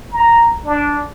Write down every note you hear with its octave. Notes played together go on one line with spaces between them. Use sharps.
A#5
D4